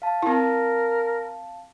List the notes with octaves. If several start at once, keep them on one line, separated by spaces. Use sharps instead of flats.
F5 A5
C4 E4 A#4